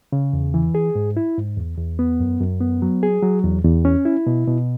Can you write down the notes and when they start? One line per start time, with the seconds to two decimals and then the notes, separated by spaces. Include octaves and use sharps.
0.12 C#3
0.33 E2
0.54 E3
0.75 G#4
0.95 G#2
1.17 E4
1.37 G#2
1.57 E2
1.78 E2
1.99 B3
2.20 F#2
2.41 F#2
2.61 B3
2.82 F#3
3.03 G#4
3.22 F#3
3.44 E2
3.64 E2
3.85 C#4
4.05 E4
4.27 B2
4.47 B2